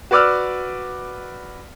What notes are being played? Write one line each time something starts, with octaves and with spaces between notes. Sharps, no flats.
F#4 B4 D5 D6 E6 F6